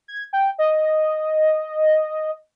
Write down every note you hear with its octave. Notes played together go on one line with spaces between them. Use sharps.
G#6
G5
D#5